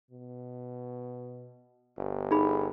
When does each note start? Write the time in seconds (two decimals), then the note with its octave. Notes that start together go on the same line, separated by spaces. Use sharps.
0.11 B2
1.97 G1
2.31 D#4 G#4 B5